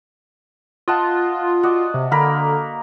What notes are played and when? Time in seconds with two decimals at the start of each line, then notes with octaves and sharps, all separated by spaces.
0.88 F4 D#5 F#5 A5
1.63 F#4 D5 D#5
1.94 C3
2.11 D3 A#3 A#4 B5